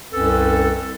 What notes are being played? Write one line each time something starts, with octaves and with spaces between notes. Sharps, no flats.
C2 F#2 C4 C#4 A4 B4